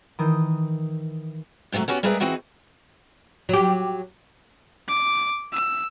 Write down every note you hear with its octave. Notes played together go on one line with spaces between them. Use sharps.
D#3 E3 D#6 G6
G#2 C3 F3 F#3 A3
B3 C#4 F#4 G4
G3 G#3 G#4 A#4 B4 E5
E3 C4 D#4 F#4 G#4
F#3 G4
D6
E6